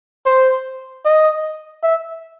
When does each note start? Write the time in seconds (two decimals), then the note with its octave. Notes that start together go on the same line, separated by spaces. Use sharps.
0.26 C5
1.05 D#5
1.83 E5